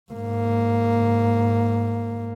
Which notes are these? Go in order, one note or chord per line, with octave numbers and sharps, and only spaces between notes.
G#2 A#3